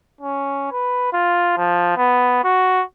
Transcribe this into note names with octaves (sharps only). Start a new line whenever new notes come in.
C#4
B4
F4
F3
B3
F#4